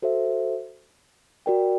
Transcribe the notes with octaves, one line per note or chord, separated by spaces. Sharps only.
F#4 A4 C5 E5
F#4 A#4 D5 G5